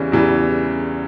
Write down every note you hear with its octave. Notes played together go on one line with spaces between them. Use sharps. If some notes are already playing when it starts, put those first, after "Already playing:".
Already playing: E2 C#3 E3 G3 C#4
E2 C#3 E3 G3